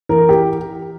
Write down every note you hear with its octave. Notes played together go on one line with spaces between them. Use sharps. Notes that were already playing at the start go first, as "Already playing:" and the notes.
E3 A#4
G4